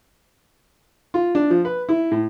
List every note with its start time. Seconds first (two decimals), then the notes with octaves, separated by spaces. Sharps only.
1.14 F4
1.35 D4
1.50 F3
1.65 B4
1.89 E4
2.11 A2